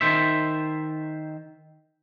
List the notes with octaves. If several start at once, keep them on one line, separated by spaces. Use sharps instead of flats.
D#3 C5 E5